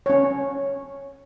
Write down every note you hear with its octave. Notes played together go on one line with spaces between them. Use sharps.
C#4 C#5